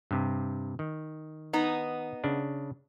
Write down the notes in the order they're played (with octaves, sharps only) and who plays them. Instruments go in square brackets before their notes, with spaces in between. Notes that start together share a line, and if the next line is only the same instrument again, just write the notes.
[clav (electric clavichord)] G2 C3
D#3
[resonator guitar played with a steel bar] B3 D#4
[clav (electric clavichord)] C#3 D4